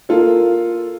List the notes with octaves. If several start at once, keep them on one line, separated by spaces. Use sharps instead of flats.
A#3 F4 A4